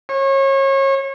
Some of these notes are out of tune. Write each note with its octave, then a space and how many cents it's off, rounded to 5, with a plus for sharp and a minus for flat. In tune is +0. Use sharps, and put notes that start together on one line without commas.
C#5 -30